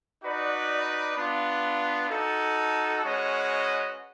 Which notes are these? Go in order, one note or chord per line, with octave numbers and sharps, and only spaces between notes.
D#4 F#4 B4 D5
B3 D4 F4
D#4 F#4 A4
G#3 C#4 F#4 B4 D#5